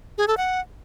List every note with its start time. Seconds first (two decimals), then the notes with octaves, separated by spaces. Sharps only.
0.18 G#4
0.28 A4
0.37 F#5